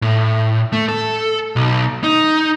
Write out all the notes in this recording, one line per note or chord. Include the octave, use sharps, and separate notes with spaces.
A2
A3
A4
B1
D#4